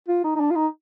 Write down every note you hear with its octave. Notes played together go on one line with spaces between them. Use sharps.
F4
D#4
D#4
D4
F4
D#4